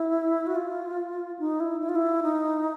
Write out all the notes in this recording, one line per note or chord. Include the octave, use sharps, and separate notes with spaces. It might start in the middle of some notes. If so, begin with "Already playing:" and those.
Already playing: E4
F#4
F4
D#4
E4
E4
F4
E4
D#4